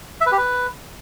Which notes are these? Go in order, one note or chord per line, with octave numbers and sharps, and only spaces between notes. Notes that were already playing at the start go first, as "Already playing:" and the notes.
E5
B4
G4
B4